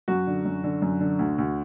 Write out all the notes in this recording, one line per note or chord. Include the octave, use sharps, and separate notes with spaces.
F#2 F#4
D3
F#2
D3
F#2
D3
D2
D2